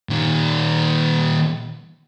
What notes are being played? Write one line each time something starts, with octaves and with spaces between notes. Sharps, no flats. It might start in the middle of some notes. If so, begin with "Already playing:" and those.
A#2 D#3